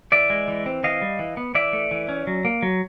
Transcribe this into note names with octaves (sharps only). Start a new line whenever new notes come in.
E3 D5 E5
G#3
E3
C4
E3 D#5 F5
G3
E3
B3
E3 D5 E5
A3
E3
C#4
F#3
A#3
F#3